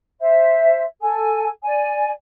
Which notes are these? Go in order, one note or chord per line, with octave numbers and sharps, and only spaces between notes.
C5 E5
A4 G#5
D5 G#5